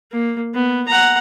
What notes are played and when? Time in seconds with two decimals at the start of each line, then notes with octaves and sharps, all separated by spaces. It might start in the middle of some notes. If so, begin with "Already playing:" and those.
0.11 A#3
0.54 B3
0.87 F#5 A#5